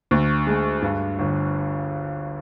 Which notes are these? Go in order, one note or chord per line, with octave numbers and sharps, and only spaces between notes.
D2
G#3
G2
G1